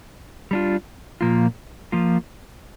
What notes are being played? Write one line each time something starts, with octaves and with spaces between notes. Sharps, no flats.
G3 D4 F4
A#2 F3 A#3 F4
F3 A#3 F4